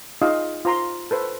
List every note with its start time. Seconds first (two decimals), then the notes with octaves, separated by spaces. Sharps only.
0.22 D#4 F4 G#4 D#5 F5
0.65 F4 C5 A#5 C6
1.11 A4 B4 C5